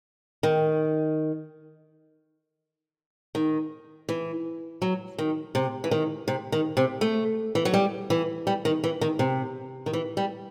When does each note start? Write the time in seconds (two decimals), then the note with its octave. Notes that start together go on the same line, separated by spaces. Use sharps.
0.43 D#3
3.35 D#3
4.09 E3
4.82 F#3
5.18 D#3
5.55 C3
5.84 E3
5.91 D#3
6.28 C3
6.52 D#3
6.77 C3
7.01 A3
7.55 E3
7.65 F#3
7.74 G3
8.10 E3
8.47 G3
8.65 D#3
8.84 E3
9.01 D#3
9.19 C3
9.86 D#3
9.93 E3
10.17 G3